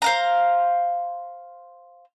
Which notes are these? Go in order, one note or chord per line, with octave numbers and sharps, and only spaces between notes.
C5 F5 A#5